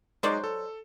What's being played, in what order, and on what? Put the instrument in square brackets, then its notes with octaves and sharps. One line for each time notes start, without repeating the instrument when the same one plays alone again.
[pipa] F#3 C5 D5 [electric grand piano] G#3 D#4
[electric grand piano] A4